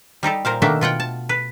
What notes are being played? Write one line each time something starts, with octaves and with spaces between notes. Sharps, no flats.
G3 D#4 G4 A4
A#2 A#4 C5 F5
B2 D#3 A3 A#3 D4 E5
B2 F4 F#5 G5
A5
B4